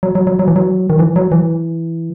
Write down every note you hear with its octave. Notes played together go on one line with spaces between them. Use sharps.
F#3
F#3
F#3
F#3
E3
F#3
D#3
E3
F#3
E3